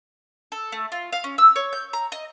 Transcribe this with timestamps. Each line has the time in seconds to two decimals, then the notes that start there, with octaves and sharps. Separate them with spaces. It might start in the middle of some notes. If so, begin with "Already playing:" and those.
0.52 A4
0.72 A3
0.92 F4
1.12 F5
1.24 C#4
1.38 E6
1.56 C#5
1.73 G6
1.93 A#5
2.12 D#5